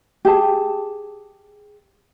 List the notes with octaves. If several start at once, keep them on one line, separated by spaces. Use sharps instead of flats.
G4 G#4 A5